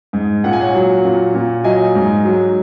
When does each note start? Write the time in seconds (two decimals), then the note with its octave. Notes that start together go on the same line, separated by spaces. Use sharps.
0.13 G#2
0.44 A#2 F#5
0.53 G#5
0.61 C#5 F#5
0.75 F#3
1.05 A#2
1.35 A#2
1.64 F#3 D#5 G#5
1.95 G#2
2.25 F#3